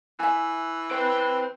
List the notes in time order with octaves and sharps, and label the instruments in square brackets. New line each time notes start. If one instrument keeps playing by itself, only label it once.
[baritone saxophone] E3 [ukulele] E5 G#5
[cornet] B4 [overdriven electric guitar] C5 G5